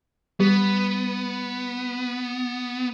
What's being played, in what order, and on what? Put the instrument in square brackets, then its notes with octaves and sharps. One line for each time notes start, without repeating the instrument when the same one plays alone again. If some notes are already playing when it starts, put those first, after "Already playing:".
[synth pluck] G3 [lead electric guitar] B3